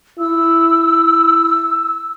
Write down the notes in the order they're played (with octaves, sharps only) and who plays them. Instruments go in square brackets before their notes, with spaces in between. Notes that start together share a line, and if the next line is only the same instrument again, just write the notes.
[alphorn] E4 [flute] E6